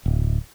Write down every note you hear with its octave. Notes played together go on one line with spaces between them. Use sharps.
D1